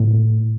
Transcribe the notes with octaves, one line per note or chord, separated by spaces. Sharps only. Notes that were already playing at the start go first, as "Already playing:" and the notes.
Already playing: A2